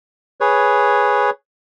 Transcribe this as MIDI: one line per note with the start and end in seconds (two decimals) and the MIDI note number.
0.41 1.30 68
0.41 1.30 71
0.41 1.30 73